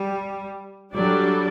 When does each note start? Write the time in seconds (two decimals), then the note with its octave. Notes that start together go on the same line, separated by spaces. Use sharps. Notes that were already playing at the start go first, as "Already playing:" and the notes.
Already playing: G3
0.94 F#3 G3 D4 A4 D5